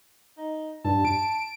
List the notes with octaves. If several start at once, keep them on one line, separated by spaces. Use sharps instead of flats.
D#4
G2 A5
D7